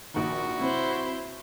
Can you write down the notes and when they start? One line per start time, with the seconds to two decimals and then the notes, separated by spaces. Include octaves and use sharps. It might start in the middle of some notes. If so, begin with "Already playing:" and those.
0.14 A#1 D#3 F#4
0.59 C3 F#3 C4 E4 C5